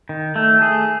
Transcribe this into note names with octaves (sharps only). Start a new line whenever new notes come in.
D#3
A3
G#4